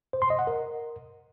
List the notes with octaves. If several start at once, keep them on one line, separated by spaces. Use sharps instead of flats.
C5
C6
D#5
F#5
A#4